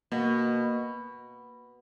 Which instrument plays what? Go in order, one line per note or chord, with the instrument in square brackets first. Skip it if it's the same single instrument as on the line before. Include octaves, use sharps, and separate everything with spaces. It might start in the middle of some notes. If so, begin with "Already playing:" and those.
[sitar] B2 [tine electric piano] A#3